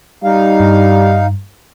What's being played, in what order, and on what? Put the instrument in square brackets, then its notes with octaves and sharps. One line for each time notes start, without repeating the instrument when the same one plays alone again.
[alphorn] G3 [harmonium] D#4 F5
[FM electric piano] G2